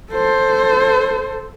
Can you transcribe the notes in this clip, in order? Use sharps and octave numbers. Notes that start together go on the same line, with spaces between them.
A4 C5